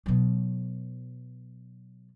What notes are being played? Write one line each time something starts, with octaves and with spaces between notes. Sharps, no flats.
B2 F#3